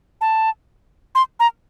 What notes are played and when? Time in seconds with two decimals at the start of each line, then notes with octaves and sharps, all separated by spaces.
0.21 A5
1.15 C6
1.40 A#5